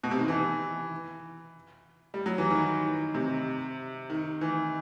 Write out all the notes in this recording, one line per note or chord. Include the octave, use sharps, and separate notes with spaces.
B2
C3
D#3
E3
G3
F#3
E3
D#3
C3
D#3
E3